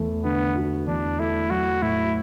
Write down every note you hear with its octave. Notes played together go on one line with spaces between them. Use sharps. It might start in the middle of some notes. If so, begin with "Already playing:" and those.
Already playing: E2 A3
D3 B3
F#4
E2 D4
A3 E4
F#3 F#4
A2 E4